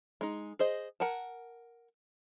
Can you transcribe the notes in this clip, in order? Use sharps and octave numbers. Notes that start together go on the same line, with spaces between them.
G#3 D#4
G#4 C5 D#5
A#4 F#5 G#5 A5